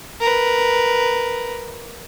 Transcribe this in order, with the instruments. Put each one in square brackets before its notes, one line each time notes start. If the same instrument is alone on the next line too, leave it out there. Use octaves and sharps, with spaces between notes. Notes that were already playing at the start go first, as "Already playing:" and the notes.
[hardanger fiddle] A#4 B4